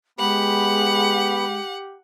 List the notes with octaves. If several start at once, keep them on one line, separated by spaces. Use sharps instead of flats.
G#3 B3 G4 F#5 B5